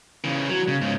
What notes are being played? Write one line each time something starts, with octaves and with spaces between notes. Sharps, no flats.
C#3 E3
F#3
C#3
G#2 C#3